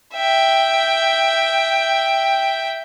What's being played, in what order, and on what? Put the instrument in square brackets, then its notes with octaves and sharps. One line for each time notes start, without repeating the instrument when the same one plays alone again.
[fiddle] E5 G5